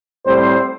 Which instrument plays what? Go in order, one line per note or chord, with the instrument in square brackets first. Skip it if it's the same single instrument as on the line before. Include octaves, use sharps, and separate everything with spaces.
[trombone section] A2 G3 C4 C5